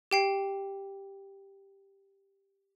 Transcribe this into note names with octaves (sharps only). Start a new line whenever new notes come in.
G4 G5 C7